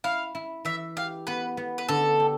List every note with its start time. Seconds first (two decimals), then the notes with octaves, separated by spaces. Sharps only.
0.04 E4 F5
0.35 E4
0.65 E3 E5
0.97 G4 F5
1.27 B3 B4
1.57 B3
1.78 B4
1.89 D3 A4
2.20 G4